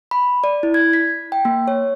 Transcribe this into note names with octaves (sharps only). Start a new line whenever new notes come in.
B5
D5
E4
G#6
B6
G5
A#3
C#5